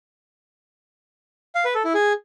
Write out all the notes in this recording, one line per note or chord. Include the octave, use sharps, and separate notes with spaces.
F5
B4
A4
E4
G#4